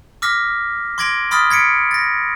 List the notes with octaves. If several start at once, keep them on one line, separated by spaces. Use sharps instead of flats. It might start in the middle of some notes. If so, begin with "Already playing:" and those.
D6 E6 F6 A#6 B6
C6 D6 G#6 A#6 D7 F#7
B5 C6 D#6 F6 A6 B6
G#6 B6 C#7 D7
A6 A#6